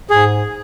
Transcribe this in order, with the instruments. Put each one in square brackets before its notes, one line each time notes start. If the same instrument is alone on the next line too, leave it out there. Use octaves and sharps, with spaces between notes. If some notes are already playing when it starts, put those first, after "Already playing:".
[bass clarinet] G#2 [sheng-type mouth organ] G#4